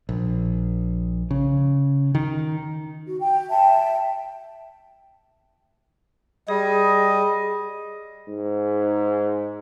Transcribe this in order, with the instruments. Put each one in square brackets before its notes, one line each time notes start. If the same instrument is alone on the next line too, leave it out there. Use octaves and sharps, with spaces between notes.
[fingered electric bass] A#1
C#3
D#3
[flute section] F#4
G5
E5 G5 A5
[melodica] G3 [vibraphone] G#4 [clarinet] D#5
[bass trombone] G#2